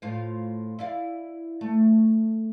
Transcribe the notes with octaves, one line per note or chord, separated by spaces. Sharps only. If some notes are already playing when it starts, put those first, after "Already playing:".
A2 F4 C5
E4 D5 F5
A3